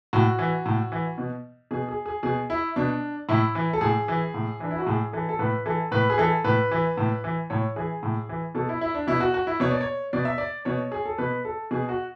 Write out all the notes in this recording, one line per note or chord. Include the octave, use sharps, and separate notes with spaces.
A2 F#4
E3
A2
E3
B2
B2 G#4
G#4
G#4
B2 G#4
E4
B2 D4
A2 E4
E3
A4
A2 G#4
E3
A2
E3 D4
E4
F#4
A2 G#4
E3 A4
A4
A2 B4
E3 A4
A2 B4
G#4
E3 A4
A2 B4
E3
A2
E3
A2 C#5
E3 G#4
A2
E3
B2 A4
E4
E4
D4
B2 E4
F#4
F#4
E4
B2 C#5
D5
C#5
B2 D5
E5
D5
B2 C#5
G#4
A4
B2 B4
A4
B2 G#4
F#4